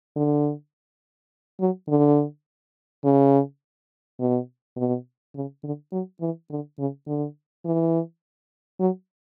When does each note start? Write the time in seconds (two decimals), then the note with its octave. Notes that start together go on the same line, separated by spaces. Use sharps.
0.17 D3
1.60 F#3
1.89 D3
3.05 C#3
4.20 B2
4.77 B2
5.35 C#3
5.64 D3
5.92 F#3
6.21 E3
6.50 D3
6.79 C#3
7.07 D3
7.65 E3
8.80 F#3